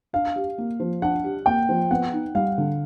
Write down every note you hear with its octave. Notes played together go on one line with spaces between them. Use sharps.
D4 F5
G4
A#3
F3
D4 F#5
G4
A#3 G5
F3
B3 F#5
D#4
G3 F5
D3